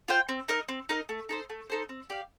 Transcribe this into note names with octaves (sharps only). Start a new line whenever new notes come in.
F4 C5 G5
C4
D#4 A#4 D#5
C4
D#4 A#4 D#5
A3
D#4 A4 C5
A3
D#4 A4 C5
C4
G4 D5 F5